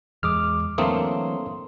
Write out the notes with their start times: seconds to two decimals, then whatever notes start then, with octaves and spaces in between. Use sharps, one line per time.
0.23 E2 G#3 D6 D#6 F6
0.78 D3 E3 F#3 A3 A#3 C4 C6 D#6